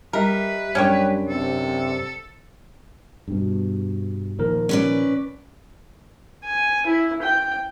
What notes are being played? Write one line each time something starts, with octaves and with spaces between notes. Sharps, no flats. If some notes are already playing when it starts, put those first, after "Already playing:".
G3 A#4 B4 D#5 E5
F#2 G3 C#4 D4 G4 C#5 D5
C3 A4
G2 B2
A#2 D#3 F3 A#4
C#4 B4 D5
G#5
E4
G5